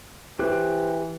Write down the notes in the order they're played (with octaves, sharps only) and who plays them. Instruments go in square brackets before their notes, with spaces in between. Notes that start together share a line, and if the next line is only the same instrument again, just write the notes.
[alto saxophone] E3 [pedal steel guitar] G4 C5 F#6